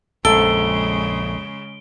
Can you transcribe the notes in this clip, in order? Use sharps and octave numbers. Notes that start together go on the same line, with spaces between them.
A#1 F2 C#3 G#3 A4 D7 G7